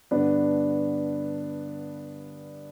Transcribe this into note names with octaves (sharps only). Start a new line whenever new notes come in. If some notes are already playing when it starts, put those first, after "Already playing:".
G2 D3 B3 D4